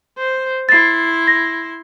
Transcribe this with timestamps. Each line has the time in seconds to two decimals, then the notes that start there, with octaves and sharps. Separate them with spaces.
0.17 C5
0.69 E4 C6 A6 C7
1.27 A#6